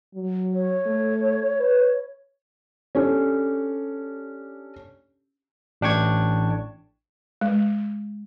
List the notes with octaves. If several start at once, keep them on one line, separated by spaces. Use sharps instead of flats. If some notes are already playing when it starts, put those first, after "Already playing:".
F#3
C#5
A3
B4
C#4 D4 G4 A4
A1 D4 G5 C#6 G#6
G#3